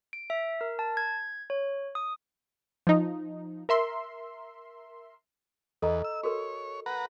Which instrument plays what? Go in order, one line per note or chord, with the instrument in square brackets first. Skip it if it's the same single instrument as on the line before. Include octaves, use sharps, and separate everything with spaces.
[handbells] D7
E5
A#4
A5
G#6
C#5
D#6
[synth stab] F3 D#4
A#4 E5 C6
[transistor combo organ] E2 [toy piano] A4 D#5 A#5
[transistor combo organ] E6
[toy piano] F#4 A4 A#4 [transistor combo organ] C#5
[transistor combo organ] B4 F#5 A#5